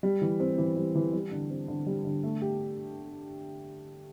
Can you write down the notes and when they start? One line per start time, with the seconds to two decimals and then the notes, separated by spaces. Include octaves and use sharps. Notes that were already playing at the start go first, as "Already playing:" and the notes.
0.03 G3
0.22 E3
0.40 C4
0.58 E3
0.77 G3
0.95 E3
1.13 G3
1.31 D3
1.50 C4
1.68 D3
1.87 G3
2.05 D3
2.23 A3
2.42 G4